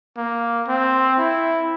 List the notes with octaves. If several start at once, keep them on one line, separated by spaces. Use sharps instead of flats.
A#3
C4
E4